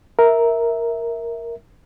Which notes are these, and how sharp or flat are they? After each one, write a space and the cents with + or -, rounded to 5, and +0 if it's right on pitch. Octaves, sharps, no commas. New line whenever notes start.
A#4 +0 E5 -10